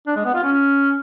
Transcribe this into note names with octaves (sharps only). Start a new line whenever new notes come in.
D4
G#3
B3
F4
C#4